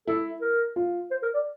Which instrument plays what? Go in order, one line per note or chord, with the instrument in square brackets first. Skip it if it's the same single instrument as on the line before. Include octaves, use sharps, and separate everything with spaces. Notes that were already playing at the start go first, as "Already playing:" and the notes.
[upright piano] E4 [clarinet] A4
[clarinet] A#4
[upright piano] F4
[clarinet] C5
A#4
D5